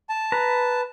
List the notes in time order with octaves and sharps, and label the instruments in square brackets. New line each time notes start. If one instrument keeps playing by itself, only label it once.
[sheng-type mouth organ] A5
[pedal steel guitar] B4 A#5